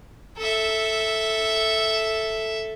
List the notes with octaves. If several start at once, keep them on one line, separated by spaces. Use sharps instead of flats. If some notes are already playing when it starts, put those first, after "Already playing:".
A4 E5